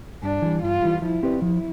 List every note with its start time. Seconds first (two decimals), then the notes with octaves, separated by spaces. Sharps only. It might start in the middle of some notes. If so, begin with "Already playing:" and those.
0.23 G2 D4
0.42 E3 G3
0.62 G2 F4
0.82 E3 G3
1.02 F3 E4
1.23 C4 G4 B4 D5
1.42 F3 E4